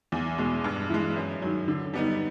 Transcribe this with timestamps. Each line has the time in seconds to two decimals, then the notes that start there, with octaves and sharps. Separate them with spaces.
0.12 E2
0.38 B2 G#3
0.64 G2
0.90 E3 G#3
1.16 F#2
1.42 D#3 F#3
1.68 D3
1.94 G3 B3 D#4